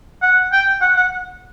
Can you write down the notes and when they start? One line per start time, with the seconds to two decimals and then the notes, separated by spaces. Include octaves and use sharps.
0.22 F#5
0.52 G5
0.82 F#5
0.96 F#5